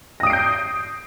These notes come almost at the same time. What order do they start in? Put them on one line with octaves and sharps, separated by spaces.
A#6 D#6 D7 C7 G6